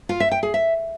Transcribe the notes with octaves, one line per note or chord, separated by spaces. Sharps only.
F4
E5
G5
G#4
E5